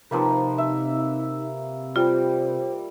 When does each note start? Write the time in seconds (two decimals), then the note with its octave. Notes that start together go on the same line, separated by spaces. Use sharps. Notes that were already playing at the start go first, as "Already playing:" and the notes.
0.11 C3 F3 A#3 D#4 B4
0.58 E5
1.96 G3 F4 C5